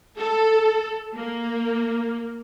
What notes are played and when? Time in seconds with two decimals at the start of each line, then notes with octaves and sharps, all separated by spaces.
0.18 A4
1.15 A#3